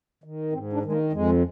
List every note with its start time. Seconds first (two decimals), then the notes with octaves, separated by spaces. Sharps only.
0.24 D#3
0.52 G#2 C4
0.73 D4
0.83 D#3 G#3
0.92 A#3
1.12 F2 G#3